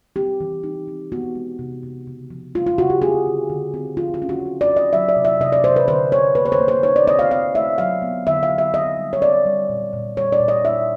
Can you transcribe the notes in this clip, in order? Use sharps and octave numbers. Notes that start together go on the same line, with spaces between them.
C4 G4
E3
D#4
C4
B3 F#4
G#3
C3
C3
C#3
F3
G#3 F4
F4
C#3 F#4
G4
C4 G#4
D3
D3
C4
F3 F4
F4
C#4
F#4
C#4
D5
C#4
D#5
F#3 E5
D5
C3
E5
C3 D#5
D5
C3 C5
B4
D3 C5
D3 C#5
A#3 B4
C#5
C5
A#3
C5
D#4 C#5
D5
C4 D#5
F5
C4 F5
A3 E5
F#3 F5
B3
D3 E5
F5
F#3
E5
C4 D#5
G3
C#5
C4 D5
G3
A#2
A#2
G3 C#5
D5
A#2
D#5
D4 E5